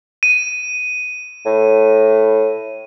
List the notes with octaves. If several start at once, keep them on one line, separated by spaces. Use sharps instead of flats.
D#7
A2